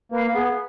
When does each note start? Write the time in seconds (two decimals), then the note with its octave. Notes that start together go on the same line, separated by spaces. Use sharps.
0.12 A#3 B4 F5
0.34 B3 G#4